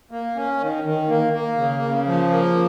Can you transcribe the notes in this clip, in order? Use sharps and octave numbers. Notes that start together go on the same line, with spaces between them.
A#3
C#4
D#3
D#3
A#3
A#3
C#3
C#3
F3
A#3